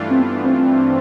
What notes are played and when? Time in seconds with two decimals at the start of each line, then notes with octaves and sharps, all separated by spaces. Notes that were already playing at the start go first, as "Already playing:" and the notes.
Already playing: G2 E3 A3 D4 F4
0.10 C4
0.20 B3
0.30 B3
0.44 C4
0.58 C4